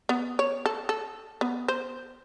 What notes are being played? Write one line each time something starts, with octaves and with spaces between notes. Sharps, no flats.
B3
C#5
A4
A4
B3
C5